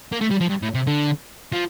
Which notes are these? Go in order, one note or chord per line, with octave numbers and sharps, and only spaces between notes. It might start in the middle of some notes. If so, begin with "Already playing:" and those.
A#3
A3
G3
F3
G2
A2
C3
D3
F3